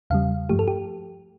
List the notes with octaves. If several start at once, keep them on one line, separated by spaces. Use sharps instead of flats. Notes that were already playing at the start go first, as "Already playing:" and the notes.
E2 C#3 G3 F5
G2 F3 A3 G4
A4
G4